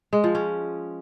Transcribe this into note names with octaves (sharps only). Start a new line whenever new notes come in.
G#3
F3
C#4